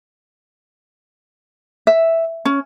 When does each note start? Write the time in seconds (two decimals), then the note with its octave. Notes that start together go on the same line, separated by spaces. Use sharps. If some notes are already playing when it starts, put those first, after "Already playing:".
1.87 E5
2.45 C#4